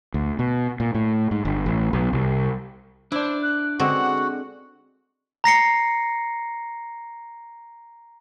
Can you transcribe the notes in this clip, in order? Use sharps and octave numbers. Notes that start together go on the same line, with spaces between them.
D2
B2
A#2
A2
G#2
G1
A1
B1
C2
D4 E4 C5 D5
F#6
D3 G#3 C4 F#4 F#5
A#5 A#6 C7 C#7